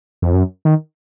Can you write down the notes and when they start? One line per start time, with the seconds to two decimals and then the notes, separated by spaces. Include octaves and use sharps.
0.22 F2
0.34 F#2
0.65 D#3